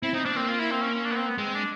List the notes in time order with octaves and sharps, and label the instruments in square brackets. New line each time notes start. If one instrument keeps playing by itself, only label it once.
[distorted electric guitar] C4 [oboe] E4
[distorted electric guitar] C4 [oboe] D#4
[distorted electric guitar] C4 [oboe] D4
[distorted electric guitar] A#3 [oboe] C4
[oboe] F4
E4
C4
C#4
C#4
D4
B3
C4
B3
[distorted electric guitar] G#3 [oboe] C4
[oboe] D4